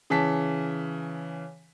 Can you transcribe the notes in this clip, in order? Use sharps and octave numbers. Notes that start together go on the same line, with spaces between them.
C#3 E3 A5 B6